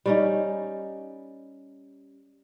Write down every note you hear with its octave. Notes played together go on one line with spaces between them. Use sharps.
G3 C#4 D#4